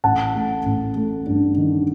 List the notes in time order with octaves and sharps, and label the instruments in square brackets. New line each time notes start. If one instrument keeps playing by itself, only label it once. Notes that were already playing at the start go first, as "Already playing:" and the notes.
[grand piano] A1 F#5 A5
A3
A1
A3
G2
D#3